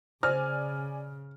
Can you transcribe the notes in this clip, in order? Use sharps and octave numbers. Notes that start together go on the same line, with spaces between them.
C#3 C5 D5 G#5 F6